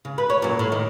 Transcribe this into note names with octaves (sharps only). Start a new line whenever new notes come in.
C#3
B4
C#5
F#2 A#2
A2
D#3